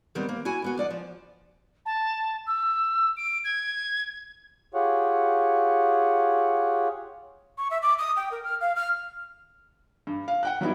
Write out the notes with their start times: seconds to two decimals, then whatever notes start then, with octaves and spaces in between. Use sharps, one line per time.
0.15 D#3 F#3 G3 B3 C4
0.29 A#3
0.45 E4 F#4 G#5
0.62 D#2 B3 F#4
0.77 F2 D5 F#5
0.90 F3
1.85 A5
2.46 E6
3.17 D7
3.44 G#6
4.74 F4 G4 G#4 C#5 F#5
7.58 C#6
7.71 E5
7.82 D6
7.99 D#6
8.17 G5
8.32 A#4
8.44 F6
8.61 F5
8.76 F6
10.07 G2
10.28 F5
10.43 F#5 G5 F#6
10.61 F#3 G3 B3 D#4 E4